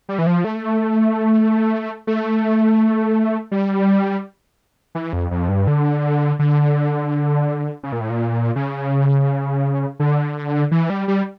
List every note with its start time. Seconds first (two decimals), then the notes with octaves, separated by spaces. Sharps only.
0.09 G3
0.19 E3
0.27 F3
0.44 A3
2.07 A3
3.51 G3
4.95 E3
5.13 F2
5.31 F2
5.49 G2
5.67 D3
6.39 D3
7.83 C#3
7.92 A#2
8.01 A2
8.10 A#2
8.56 C#3
10.00 D3
10.71 E3
10.90 G3
11.08 G3